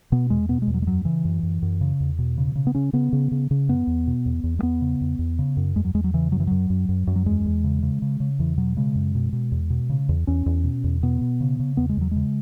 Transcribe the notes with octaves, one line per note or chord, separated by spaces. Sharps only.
B2 B3
E2 G#3
B2 B3
G#3
E2
F#3
G#3
F#2 F#3
C#3 E3
F#2
F#2
F#2
C#3
E2
B2
C#3
C#3
B3
C#3 C#4
C#3 B3
C#3
C#3
C#3
F#2 B3
E2
B2
E2
E2
G#3
E2 B3
C#3
E2
E2
C#3
F#2
E2 G#3
F#3
E2 G#3
F#3
C#3 E3
F#2 F#3
E3
F#2 F#3
F#2
F#2
F#2
F#3
E2 G#3
E2
C#3
C#3
C#3
C#3
E2 E3
B2 F#3
C#3 G#3
F#2
B2
B2
E2
B2
C#3
E2
E2 C#4
E2
B2
E2
B2 B3
B2
C#3
C#3
E2 B3
G#3
E2 F#3
C#3 G#3